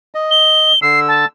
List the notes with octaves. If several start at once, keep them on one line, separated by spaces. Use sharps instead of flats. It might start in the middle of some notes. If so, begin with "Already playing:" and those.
D#5
G7
D3 E6 C7
A5